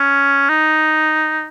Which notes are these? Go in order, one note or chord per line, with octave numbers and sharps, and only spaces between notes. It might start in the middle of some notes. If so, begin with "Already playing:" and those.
Already playing: C#4
D#4